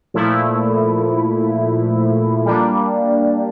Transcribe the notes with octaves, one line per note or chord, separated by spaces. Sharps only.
A#2 F3 A3 E4
G3 A#3 D4